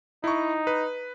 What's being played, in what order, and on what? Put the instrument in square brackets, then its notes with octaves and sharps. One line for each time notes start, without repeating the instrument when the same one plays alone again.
[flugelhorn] D#4 [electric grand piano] E4 C#6
[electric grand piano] B4